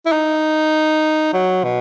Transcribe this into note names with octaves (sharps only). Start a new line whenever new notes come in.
E4
D#4
F#3
B2